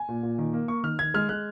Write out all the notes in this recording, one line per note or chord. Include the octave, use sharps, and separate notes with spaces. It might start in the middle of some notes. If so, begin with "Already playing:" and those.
Already playing: G#5
A#2
A#2
D#3
A#3
A#3 C#6
D#3 F6
D#3 G#6
G#3 F6
G#3 F#6